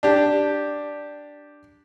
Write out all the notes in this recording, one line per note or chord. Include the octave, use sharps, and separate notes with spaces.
D4 G4